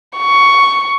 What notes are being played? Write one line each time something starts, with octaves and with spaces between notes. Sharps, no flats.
C#6